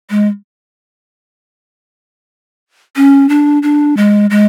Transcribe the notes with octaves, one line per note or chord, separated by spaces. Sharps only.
G#3
C#4
D4
D4
G#3
G#3